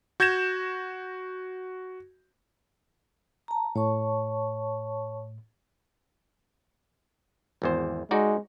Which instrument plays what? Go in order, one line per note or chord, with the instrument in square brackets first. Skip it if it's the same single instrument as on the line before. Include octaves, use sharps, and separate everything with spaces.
[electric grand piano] F#4 G6 G#6 A#6 E7
[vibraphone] A5 A#5
[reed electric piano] A2 [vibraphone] C#5 A5 C#6
[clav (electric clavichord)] G#1 E2 C5
[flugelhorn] G#3 [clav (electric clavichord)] D#4 F#4 D5